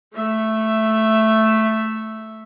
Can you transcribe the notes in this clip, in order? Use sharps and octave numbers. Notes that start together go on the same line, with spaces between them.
A3 E5